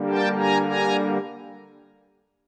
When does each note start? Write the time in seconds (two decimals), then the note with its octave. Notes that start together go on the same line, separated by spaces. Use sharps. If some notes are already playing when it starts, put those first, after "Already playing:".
Already playing: D3 G3 A#3
0.08 G5 A5
0.38 G#5 A#5
0.66 G#5 A#5